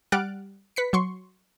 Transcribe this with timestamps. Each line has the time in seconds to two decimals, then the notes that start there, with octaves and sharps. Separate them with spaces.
0.12 G3 F#5 F6 F#6 A6 D7
0.76 B4 B6 C#7
0.93 F#3 C6 C#6